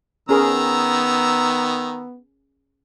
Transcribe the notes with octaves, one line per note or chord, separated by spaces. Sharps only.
D#3 B3 C#4 G#4 A#4 A#5 E6